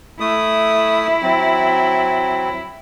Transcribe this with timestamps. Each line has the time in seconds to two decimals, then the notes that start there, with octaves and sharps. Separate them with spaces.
0.20 A3 E4 D#6
1.22 F#3 C4